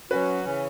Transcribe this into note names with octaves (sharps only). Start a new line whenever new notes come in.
F#3 C#4 F#4 B4
C#3 E3 C#4